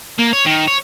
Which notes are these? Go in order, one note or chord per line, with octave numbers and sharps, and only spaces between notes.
A#3
C#5
D#3
C#5